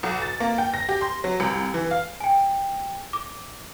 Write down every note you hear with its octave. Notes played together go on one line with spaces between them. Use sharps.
B1
A6
A#3
G5
A#6
G4
C6
F#3
C2
E3
F5
G5 G#5
D6